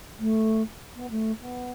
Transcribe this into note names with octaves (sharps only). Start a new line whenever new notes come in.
A3
B3
A3
B3